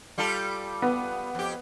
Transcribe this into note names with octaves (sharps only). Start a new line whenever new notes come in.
G3 F4 A4
B3
F2 G4